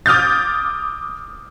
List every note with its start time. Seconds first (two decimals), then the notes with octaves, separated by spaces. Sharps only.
0.06 D6 D#6 F6 G6 A6